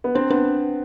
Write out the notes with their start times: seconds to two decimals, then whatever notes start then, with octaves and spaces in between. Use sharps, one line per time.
0.04 B3
0.15 C4 D4
0.30 B3 D4